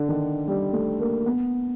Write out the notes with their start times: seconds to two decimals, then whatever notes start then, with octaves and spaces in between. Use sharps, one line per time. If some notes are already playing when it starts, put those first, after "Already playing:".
Already playing: D3
0.09 D#3
0.48 G3
0.73 A3
1.00 A#3
1.26 B3